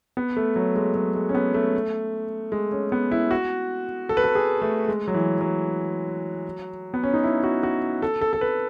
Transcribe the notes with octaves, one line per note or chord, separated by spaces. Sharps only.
B3
A3
F#3
G#3
F#3
G#3
C#4
B3
A3
G#3
C#4
B3
E4
F#4
A4
B4
A4
G#4
A3
G#3
F#3
E3
F#3
B3
C#4
D#4
E4
F#4
F#4
A4
A4
A4
B4